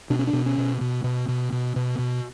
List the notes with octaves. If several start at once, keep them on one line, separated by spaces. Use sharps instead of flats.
B2 D4
C#4
D4
B2
C#4
B2
B2
B2
B2
B2
B2
B2